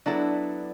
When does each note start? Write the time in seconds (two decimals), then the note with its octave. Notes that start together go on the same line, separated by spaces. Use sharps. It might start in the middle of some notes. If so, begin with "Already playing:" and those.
0.06 F#3 B3 D4 E4 A4 D5